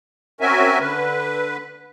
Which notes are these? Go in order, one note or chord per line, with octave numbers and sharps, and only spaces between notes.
C4 C#4 F#4 A#4 E5 G#5
D3 B4